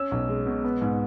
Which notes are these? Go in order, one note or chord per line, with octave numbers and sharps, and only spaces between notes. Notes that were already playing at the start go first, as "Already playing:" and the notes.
Already playing: C#4 E6
B1
G#3
B2
B3
G#2